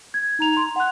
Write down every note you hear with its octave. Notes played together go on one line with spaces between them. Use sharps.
G#6
D#4 A#5 F7
C6
F#5 F#6